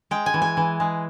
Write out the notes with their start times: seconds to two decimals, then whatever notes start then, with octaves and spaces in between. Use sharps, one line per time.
0.11 G#3 G5
0.26 G#5
0.34 E3
0.42 G#5
0.57 E3
0.80 G#3